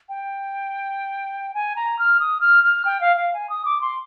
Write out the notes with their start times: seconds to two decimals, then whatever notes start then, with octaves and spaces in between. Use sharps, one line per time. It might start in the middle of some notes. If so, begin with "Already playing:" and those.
0.09 G5
1.54 G#5
1.76 A#5
1.99 F6
2.20 D#6
2.41 F6
2.64 F6
2.85 G5
3.01 F5
3.17 F5
3.34 G#5
3.50 D#6
3.65 D6
3.81 C6